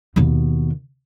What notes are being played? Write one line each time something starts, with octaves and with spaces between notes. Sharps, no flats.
D#2 B2